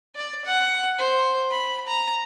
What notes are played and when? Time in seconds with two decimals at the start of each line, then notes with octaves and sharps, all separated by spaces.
0.15 D5
0.45 F#5
0.98 C5
1.51 B5
1.87 A#5